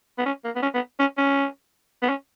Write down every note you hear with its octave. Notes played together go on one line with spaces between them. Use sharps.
B3
C#4
A#3
B3
C#4
B3
C#4
C#4
B3
C#4